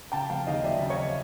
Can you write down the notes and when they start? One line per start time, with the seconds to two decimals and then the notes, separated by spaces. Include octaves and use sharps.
0.12 C#3 G5 A5
0.30 F1 F5 G5
0.47 D#2 D#5 F5
0.64 F#3 D5 E5
0.81 C#3
0.90 C#5 D#5